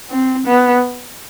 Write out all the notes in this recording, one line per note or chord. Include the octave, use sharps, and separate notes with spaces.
C4
B3